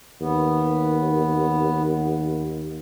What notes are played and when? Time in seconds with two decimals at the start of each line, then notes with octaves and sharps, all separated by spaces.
0.21 D#2 B3